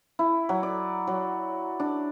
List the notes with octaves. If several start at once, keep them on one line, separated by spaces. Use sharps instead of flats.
E4
F#3
D5
F#3
D4